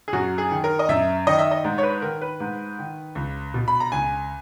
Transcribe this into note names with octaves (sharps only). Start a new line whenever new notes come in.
G#4
F#2 F#4
G#4
D#3
A#4
D#5
F#2 E5
D#3 D#5
E5
D#5
G#2
C#5
B4
D#3 A#4
B4
G#2
D#3
C#2
B2
B5
A#5
C#2 G#5